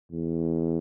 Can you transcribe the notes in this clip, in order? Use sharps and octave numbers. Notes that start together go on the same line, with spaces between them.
E2